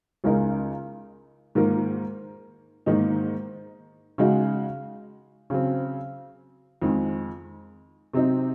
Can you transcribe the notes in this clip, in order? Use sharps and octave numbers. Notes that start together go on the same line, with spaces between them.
C#2 C#3 G#3 D#4 A#4
G#2 D#3 A#3 F4 A#4
G#2 D#3 A#3 D#4
C#3 G#3 D#4 F#4
C#3 F#3 C4
F2 D#3 G#3
C3 F#3 C4 D#4